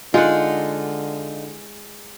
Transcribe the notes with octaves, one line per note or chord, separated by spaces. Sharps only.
D3 G#3 D#4 F4 F#5